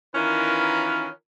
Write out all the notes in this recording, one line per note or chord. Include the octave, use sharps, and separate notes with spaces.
D#3 E3 C#4 F4 A#4 B4